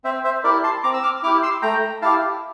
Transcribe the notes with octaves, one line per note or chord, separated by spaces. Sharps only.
C4 C5 E5
C5 E5
E4 G4 A#4 D5
A5 C6
C4 A#5 D6
E6
D6 F6
E4 G4 D6 F6
C6 E6
A3 G5 A#5
E4 G4 F5 A5